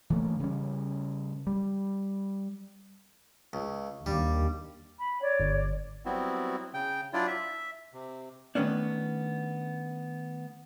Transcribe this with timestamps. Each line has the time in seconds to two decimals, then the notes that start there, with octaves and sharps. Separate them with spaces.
0.10 E3 A3 A#3
0.40 C#3 G3 C#4
1.47 G3
3.53 C#2
4.06 D#2 G3 D4 F5 D6
4.98 B5
5.21 C#5 D5
5.40 G1
6.06 F#3 G3 B3 C4 E4 F#4
6.74 C#3 G5
7.13 F#3 D4 E4 F4 D5
7.27 E5
7.93 C3
8.55 D#3 A3 B3 C#4 D4